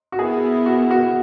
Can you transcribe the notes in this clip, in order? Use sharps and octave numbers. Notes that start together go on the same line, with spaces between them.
F#4
B3 E4 G#4 A#4
F#4
F#4